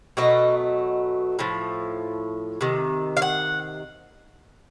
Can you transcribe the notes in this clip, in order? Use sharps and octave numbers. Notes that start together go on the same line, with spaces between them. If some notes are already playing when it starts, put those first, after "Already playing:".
B2 F#3 A3 D#5
A2 F3
C3 D#3
F5
F#5